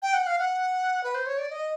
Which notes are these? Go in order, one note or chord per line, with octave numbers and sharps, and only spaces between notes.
G5
F#5
F5
F#5
B4
C5
C#5
D5
D#5